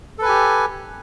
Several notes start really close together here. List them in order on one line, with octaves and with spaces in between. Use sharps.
A4 B4 G#5 G4